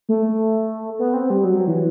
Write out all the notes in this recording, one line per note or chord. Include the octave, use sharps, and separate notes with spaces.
A3
B3
C4
G3
F#3
E3